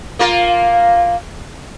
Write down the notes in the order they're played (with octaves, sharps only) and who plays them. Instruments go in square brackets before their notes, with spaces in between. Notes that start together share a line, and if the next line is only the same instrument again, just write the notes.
[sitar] A#3 F4 A#4